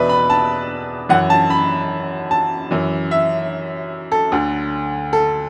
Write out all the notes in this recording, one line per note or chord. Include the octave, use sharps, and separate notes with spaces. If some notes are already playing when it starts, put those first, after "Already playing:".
Already playing: E2 B2 B4 D5 E5
B5
A5
F#2 E3 F#5
A5
B5
A5
F#2 E3
E5
A4
D2 D3
A4